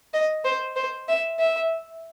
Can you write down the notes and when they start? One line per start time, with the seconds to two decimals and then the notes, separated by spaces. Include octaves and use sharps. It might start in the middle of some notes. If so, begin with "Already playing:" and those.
0.14 D#5
0.45 C5
0.76 C5
1.08 E5
1.39 E5